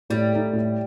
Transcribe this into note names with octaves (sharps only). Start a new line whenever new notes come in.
A2 G3
A3 D#4
A2